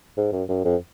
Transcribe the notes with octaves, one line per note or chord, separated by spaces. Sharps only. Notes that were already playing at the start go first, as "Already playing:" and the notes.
G#2
F#2
F#2
F2